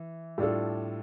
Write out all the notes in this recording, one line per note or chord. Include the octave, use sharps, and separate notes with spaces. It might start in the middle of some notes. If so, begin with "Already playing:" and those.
Already playing: E3
A2 G3 D4 F4 A4